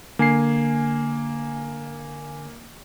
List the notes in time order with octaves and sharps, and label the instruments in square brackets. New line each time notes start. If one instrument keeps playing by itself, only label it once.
[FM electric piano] D3 G#5 [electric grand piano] A#3 C7